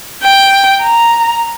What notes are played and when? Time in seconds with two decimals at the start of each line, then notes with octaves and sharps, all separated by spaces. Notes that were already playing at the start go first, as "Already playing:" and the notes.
0.22 G5
0.81 A#5